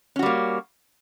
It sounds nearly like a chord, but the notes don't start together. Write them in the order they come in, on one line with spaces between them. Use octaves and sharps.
C#4 F#4 G3 A#3